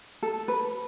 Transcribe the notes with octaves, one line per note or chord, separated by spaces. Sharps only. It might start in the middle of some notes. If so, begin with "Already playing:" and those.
A4
B4